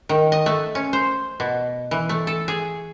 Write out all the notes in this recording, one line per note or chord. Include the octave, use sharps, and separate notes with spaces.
D#3
D#5
A3
C#4
C5
B2
E3
A3
A4
G#4